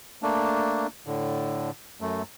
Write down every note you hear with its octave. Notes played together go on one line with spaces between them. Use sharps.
A3 A#3 D4
A2 D3
F#2 A3